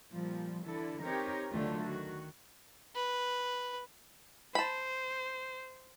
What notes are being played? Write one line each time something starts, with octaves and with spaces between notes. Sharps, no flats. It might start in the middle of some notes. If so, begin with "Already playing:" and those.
A#2 F3 G3
D3 E3 E4 A4
C4 D#4 G4 A#4 C#5
D2 D3 D#3 F#3 A3 F4
D#3 F#4
B4
C5 A5 B5